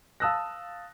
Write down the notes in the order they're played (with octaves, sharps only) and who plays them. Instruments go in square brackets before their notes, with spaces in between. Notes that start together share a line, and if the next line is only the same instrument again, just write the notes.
[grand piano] F5 A5 D#6 E6 F#6 A#6